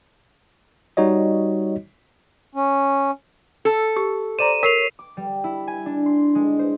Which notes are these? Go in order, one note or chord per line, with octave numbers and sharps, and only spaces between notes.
G3 D#4 F#4 C#5 D#5
C#4
A4
G4
C5 D5 A#5 D#7 E7
A#4 C#5 B6 C7 F7
D6
G3
E4
G#5
D4
C6
G#3
C5